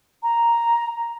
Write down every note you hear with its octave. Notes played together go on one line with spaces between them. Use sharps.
A#5